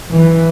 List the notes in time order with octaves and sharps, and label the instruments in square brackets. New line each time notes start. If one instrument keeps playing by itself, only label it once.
[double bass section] E3